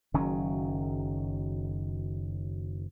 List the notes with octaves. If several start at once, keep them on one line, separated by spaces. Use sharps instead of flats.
F#1 D#3 F#3 C#4